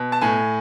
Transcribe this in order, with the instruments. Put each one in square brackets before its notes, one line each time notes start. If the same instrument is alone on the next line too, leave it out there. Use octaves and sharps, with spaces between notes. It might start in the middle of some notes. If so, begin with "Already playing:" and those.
Already playing: [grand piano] B2
A5
A2 G#5